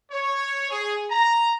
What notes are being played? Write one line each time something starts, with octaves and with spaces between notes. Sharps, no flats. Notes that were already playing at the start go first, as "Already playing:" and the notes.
C#5
G#4
A#5